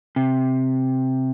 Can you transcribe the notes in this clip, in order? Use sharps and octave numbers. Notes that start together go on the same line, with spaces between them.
C3